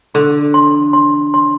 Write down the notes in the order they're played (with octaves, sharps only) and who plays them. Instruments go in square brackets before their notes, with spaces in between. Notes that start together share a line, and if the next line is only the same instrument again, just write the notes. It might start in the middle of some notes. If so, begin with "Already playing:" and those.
[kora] D3 [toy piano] C6
[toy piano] C6
C6
C6